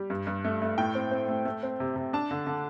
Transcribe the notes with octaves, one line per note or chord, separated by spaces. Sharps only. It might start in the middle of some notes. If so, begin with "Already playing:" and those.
Already playing: G3
G2
G2
A3
A3
A2 G5
C4
C4
A3
A3
C4
C3
C3
D4 A5
D3
D3